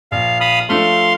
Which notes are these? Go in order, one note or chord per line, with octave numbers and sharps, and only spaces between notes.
A#1 F5
F5 B5 D#6
F3 A3 D4 F5 C6